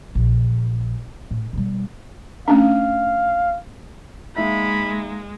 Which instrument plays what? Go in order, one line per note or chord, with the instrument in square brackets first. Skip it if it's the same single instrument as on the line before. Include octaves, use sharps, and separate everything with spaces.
[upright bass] A#1
A2
B2 G3
[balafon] A3 C#4 D4 [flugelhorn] F5
[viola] G#3 [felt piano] A#3 D#4 E5 [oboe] B5